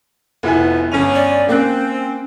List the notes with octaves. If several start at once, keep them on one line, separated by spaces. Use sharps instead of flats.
F1 F2 B3 E4 G#5
G1 C#4 G#5 F7
D5
A#3 C4 C#4 F#6